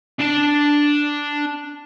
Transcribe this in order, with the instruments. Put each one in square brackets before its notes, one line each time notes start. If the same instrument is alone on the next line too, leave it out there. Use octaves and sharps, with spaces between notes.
[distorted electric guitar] D4 A5